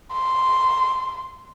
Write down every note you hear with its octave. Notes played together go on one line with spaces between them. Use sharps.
C6